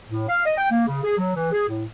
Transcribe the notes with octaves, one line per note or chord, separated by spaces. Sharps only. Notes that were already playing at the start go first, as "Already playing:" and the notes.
A2
F5
D#5
G5
A#3
C#3
G#4
F#3
E3
G#4
A2